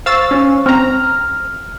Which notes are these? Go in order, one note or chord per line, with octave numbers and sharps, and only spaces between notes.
C5 F5 C#6 E6 A6
C#4
C4 A#5 F6